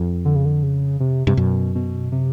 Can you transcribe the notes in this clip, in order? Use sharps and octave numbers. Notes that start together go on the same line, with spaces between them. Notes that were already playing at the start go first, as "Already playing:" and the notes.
Already playing: F2
D3
C#3
D3
C#3
C3
G2 C3
F#2 B2
B2
C3